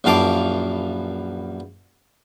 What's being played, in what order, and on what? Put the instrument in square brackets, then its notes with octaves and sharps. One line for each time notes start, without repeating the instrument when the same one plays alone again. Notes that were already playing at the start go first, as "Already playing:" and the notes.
[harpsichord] A#1 F#2 E3 F5 A5 D6